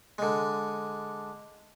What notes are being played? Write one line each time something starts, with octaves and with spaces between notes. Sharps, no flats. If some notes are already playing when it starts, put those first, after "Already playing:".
D3 G#3